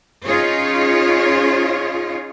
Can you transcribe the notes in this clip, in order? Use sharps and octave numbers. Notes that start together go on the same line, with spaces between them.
C#4 D#4 F4 G#4 C#5